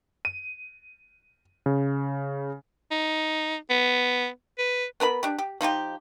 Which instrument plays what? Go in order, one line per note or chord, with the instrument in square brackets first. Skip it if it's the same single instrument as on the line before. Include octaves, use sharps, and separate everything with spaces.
[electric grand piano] D#7
C#3
[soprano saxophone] D#4
B3
B4
[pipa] B3 A#4 B4 B5
D4 G4
G4
F3 D#4 F4 G4